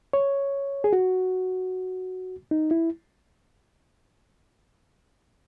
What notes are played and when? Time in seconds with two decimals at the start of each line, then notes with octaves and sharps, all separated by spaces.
0.13 C#5
0.84 G#4
0.93 F#4
2.51 D#4
2.71 E4